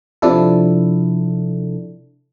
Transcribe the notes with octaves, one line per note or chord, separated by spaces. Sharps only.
C3 F3 D4 E4 A4